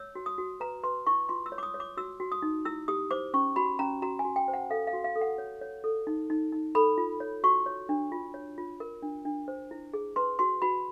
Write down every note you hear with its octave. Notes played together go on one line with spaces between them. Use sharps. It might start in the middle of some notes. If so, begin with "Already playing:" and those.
Already playing: C#5 E6
F#4
D#6
F#4
B4 A#5
B4 C6
E4 C#6
F4 C6
E6
C#5
D6
D#6
C#5
D6
F#4 E6
F#4
D#6
D#4
E4 E6
G4 D#6
C5 D6
C#4 C#6
F#4 B5
C#4 A#5
F#4 A#5
G#5
F#4
G5
C5
F#5
A4 F5
F5
F#4
F5
A4
F#5
C#5
C#5
A4
D#4
D#4
D#4
A4 B5
F4
C#5
F#4 C#6
C#5
D4
F4
C#5
F4
A#4
D4
D4
C5
E4
G#4
B4 C6
F#4 C6
F#4 B5